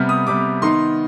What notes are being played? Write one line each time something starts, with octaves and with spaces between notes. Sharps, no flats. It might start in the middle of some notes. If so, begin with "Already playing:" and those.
Already playing: C3 G3 B3 F6
D#6
C3 G3 B3 D6
D#3 B3 D#4 C6